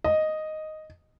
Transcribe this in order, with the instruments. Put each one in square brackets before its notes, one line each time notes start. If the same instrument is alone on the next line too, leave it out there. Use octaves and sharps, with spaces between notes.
[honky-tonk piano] D#5